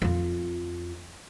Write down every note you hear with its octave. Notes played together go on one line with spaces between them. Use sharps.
F2 F4